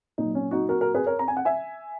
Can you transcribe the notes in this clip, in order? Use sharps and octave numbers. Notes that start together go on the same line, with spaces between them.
A#2 F#3 D#4
C#4
D#4 F#4
F#4 A#4
F#4 A#4
G#4 B4
A#4 C#5
A#5
G#5
F#5
E5 G#5